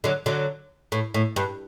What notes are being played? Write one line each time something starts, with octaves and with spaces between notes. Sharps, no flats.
D3 F#3
D3 F#3
A2
A2
G2